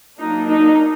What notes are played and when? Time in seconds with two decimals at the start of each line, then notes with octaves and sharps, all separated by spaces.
0.20 F#3 A#3 D4 D#4
0.50 D#4